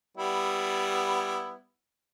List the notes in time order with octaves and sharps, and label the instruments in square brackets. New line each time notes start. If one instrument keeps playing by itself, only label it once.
[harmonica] G3 B3 E4